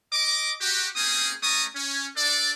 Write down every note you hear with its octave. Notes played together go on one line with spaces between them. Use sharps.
D#5 D6
F#4 G4
A#3 C4 C#4 G4 G#4 D#6
A3 C#4 D5 A#5 C#6 D#6
C#4
D4 A4 D5